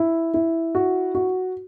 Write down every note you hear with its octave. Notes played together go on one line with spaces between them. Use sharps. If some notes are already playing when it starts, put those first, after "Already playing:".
Already playing: E4
E4
F#4
F#4